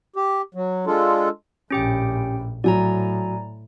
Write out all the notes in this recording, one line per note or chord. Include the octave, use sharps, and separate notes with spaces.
G4
F#3
G#3 D4 F4 A4
A#1 A2 C#4 G4 G5
A2 F#3 D5 G#5 A#5